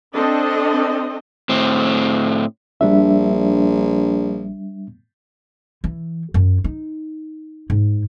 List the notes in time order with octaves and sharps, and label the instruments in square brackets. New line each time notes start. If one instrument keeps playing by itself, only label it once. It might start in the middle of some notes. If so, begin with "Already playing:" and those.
[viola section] C4 D4 A4 D#5
[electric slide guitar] A2 C4
[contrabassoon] A#1 [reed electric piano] G3 D4 E5
[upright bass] E3
F#2
D#4
G#2